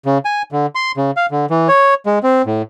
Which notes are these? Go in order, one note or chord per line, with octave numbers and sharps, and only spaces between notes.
C#3
G#5
D3
C6
C#3
F5
D3
E3
C#5
G#3
C4
A2